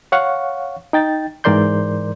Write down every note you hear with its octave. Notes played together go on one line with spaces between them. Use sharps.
C#5 F5 F#5 C#6
D#4 G5 A6
G#2 E3 A#4 D5 C6 G6